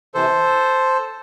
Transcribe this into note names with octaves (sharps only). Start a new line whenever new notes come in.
C3 E3 A4 C5